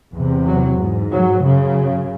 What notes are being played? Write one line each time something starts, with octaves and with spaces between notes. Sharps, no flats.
E2 C3
F#3
G#2
F#3
F#2 C#3